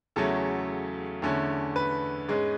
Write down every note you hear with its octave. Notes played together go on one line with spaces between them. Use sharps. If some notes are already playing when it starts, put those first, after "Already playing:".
E2 C#3 F#3 A3 C#4 A4
E2 D3 A3 C#4
B4
G#2 G#3 C#4